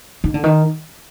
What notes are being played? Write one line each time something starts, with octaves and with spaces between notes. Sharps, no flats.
D#3
D3
D#3